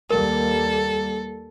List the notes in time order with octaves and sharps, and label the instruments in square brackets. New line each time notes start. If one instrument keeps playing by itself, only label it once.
[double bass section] D#2 G3 A#3 [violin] A4 [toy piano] A#4